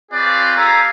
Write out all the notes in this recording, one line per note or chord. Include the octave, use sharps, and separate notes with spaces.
C4 F4 G#4 B4 C#5 D5
G4 A4 F5 G#5 A#5